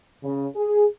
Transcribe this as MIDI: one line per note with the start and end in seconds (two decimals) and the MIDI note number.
0.24 0.47 49
0.56 0.85 68